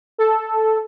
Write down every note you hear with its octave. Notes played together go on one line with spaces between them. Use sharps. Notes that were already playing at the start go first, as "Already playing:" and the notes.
A4